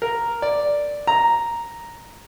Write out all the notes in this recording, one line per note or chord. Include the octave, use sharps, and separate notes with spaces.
A#4
D5
A#5